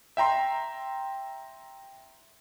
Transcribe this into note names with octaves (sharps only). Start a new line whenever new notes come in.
E5 G5 A#5 C6